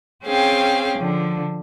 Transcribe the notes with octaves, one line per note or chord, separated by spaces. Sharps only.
C4 C#4 G#4 F5 G5
D3 F3